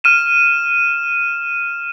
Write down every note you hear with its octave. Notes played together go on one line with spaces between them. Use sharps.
F6 D#7 E7